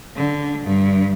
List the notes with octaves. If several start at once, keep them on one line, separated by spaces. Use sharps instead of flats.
D3
G2